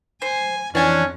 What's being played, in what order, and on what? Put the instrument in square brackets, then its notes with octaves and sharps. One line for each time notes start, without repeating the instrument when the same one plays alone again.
[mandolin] C5 [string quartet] G#5
[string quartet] F2 [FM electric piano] E3 [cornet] C#4 [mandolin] D4 G#5